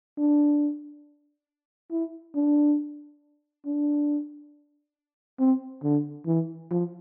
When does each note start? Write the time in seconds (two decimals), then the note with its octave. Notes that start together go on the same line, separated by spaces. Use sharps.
0.17 D4
1.91 E4
2.35 D4
3.65 D4
5.39 C4
5.83 D3
6.26 E3
6.71 F3